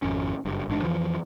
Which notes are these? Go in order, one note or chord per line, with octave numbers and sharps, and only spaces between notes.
G#1 F2 C#4
F#1 G2
A1 G#2 D4
F2 B2 E3 F3